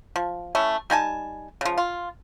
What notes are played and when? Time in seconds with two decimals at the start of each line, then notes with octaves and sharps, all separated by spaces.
0.16 F3
0.55 A3 C#4 E4
0.90 G3 D#4 G#5 A5
1.61 C#3 F3
1.78 F4